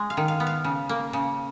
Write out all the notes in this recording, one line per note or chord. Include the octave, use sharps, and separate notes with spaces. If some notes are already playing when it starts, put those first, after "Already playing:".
Already playing: G#3
F5
D#3
F5
B3
F5
C#3
A#3
C#3